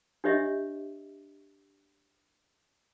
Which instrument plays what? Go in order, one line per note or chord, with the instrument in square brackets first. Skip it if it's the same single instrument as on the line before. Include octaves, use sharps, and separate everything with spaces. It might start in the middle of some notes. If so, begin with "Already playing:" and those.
[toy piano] D4 G4 C#5 D#5 E5